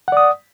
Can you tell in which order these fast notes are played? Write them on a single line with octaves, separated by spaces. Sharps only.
F#5 D5 D#6